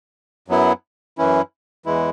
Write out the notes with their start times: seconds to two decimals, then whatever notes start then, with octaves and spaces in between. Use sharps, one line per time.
0.48 F#2 F#3 B3 E4
1.18 F#2 E3 C#4 E4
1.86 E2 E3 G#3 E4